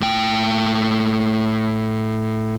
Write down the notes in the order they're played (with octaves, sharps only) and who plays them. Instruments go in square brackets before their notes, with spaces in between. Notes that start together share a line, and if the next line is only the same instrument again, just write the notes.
[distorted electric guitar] A2 G5